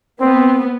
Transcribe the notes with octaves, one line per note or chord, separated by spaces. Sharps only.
B3 C4